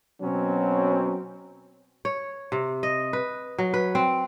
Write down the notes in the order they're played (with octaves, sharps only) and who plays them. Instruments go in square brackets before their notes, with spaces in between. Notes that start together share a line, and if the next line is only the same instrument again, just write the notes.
[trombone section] B2 F#3 C4 C#4
[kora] C#5
C3
D#5
B4
F#3
B4
C4